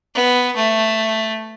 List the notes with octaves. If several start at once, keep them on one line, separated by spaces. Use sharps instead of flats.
B3
A3